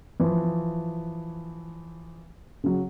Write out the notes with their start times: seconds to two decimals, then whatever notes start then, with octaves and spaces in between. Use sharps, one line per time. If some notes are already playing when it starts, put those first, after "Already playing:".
0.20 E3 F3
2.64 C#3 F#3